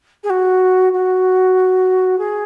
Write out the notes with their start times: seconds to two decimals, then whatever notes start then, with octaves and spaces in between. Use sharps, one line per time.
0.23 G#4
0.30 F#4
0.93 F#4
2.18 G#4